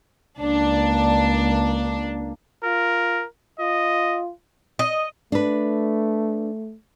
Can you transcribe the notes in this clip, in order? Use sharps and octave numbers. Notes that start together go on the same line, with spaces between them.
C#2 A#3 D4
F4 A#4
F4 D#5
D#5
A3 D4 B4